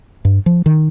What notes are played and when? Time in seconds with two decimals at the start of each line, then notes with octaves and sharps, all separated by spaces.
0.25 G2
0.46 F3
0.66 D#3